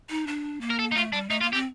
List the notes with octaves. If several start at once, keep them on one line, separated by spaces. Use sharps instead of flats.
D#4
D4
A#3
A#4
A4
D#4
A3 F4
G3 D4
A3 D#4
A#3 F4
C4 G4